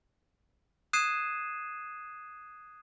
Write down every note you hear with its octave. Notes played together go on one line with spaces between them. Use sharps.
D#6 F#6 G#6 C7 D#7 E7